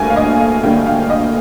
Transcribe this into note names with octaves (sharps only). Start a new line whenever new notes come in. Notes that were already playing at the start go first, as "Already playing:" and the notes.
Already playing: D2 D3 G3 A#3 G#5
F5
D#5
F5
D2 D3 G3 A#3 G5
F5
D#5